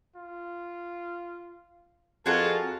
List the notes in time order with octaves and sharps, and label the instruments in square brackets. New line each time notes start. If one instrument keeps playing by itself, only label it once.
[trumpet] F4
[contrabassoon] F2 [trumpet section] F4 A5 [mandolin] F#4 G#4 [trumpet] A#4